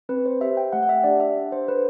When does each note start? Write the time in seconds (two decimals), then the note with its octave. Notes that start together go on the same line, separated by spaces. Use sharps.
0.09 C4 B4
0.26 C5
0.41 G4 E5
0.57 G5
0.72 A3 F#5
0.83 F#5
0.89 E5
1.04 D4 G4 D5
1.20 E5
1.36 D4
1.52 C5
1.68 A4 B4